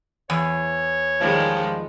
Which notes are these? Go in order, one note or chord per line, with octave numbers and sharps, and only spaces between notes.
E2 C#5
D#3 F3 G3 G#3